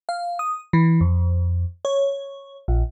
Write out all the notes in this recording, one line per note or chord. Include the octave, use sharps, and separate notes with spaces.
F5
D#6
E3
F2
C#5
A#1